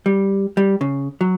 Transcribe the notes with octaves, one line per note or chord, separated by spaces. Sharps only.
G3
G3
C#3
F#3